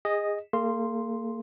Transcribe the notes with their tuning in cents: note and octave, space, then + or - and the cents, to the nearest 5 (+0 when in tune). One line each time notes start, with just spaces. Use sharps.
G#4 -25 D#5 +0
A#3 -25 G#4 +25 C6 +0